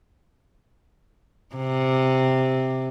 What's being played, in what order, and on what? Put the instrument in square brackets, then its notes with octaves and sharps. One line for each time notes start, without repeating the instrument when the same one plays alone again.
[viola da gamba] C3